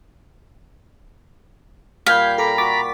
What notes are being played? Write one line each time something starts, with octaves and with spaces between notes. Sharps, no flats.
A#2 G3 F5 G6 G#6 B6
A4 A#5 B5 D6
F#4 D6 A6 B6